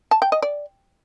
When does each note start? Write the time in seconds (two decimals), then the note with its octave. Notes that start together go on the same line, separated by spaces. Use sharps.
0.11 A5
0.22 G5
0.32 D#5
0.42 D5